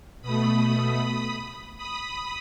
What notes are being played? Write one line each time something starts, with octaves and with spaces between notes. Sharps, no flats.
B2 A3 B5 D#6
B5 D#6